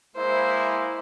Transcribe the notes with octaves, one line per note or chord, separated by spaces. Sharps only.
G#3 A#3 E4 C5